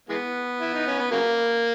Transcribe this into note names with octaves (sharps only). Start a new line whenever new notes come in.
E3 G#3 B3
E4
D#4
C#4
B3
C#3 F#3 A#3